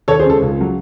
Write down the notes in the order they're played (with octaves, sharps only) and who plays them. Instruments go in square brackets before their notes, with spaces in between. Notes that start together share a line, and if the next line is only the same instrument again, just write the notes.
[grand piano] D#2 A4 C#5
G#4 C5
C#3 G#3 A4
C#2
C#3 F#3